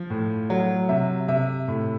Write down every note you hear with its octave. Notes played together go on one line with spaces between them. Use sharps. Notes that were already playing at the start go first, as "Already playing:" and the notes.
Already playing: F3
A2
F#3
C3 E5
C3 E5
A2